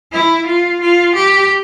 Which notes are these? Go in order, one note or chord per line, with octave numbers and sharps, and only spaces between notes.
E4
F4
F4
G4